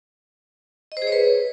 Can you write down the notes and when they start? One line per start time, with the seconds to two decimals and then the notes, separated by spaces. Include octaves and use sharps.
0.92 D#5
0.97 C5
1.02 G#4
1.07 C#5
1.12 B4